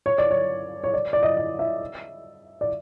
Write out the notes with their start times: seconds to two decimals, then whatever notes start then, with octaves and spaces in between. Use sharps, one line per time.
0.06 C#5
0.18 D5
0.31 C#5
0.84 C#5
0.94 D5
1.13 D5
1.23 D#5
1.37 D#5
1.59 E5
2.61 D5